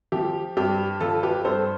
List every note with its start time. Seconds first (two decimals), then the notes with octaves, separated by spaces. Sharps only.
0.12 F3 G4
0.57 G2 G4
1.00 F3 F4 A4
1.23 G4 B4
1.45 G2 A4 C5